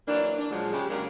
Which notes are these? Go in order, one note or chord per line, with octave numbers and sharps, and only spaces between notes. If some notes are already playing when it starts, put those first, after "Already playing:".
E3 F#3 A#3 D4
D4
A#2 F3 F#3 G#3
C#3 G#3 G4
C#3 F#3 G#3 A#3 D4 A#4